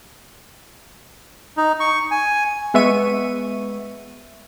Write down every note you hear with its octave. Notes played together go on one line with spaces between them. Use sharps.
D#4
C#6
G#5
G#3 B3 E5 C#6 D#7